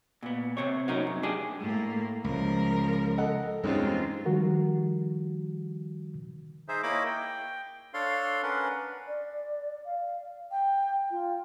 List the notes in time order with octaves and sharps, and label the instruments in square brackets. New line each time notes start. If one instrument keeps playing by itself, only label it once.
[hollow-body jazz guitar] A#2 B3
C3 C4 C#5
F#3 C#4 D#4 A#4
F#2
D4 G4 G#4
[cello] A2 A#3
[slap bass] C#2 [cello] F3 A#4
[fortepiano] A4 D#5 F#5
[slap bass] E2 G2 [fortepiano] G#3 C#4 D#4 [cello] C4 F4
[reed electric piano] D#3 F3 G3 F#4 A#4
[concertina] D#4 G#4 C5 E5
A#3 E4 C#5 D#5 B5 D6
G5
D4 A4 C#5 F5 C6
C#4 D4 A#4 B4 F#5
[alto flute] D5
F5
G5
F4